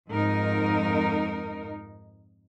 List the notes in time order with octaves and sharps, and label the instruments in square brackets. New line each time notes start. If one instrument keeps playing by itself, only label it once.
[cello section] F2 G#2 D#4 A#4